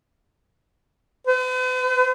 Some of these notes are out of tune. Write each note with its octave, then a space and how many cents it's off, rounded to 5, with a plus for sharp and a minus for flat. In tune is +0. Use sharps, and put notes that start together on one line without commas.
B4 +45